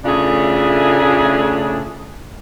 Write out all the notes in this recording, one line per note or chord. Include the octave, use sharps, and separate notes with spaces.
A2 C#3 A3 D4 F4 G#4